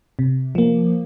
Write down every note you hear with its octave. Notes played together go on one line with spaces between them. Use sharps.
C3
F3 A#3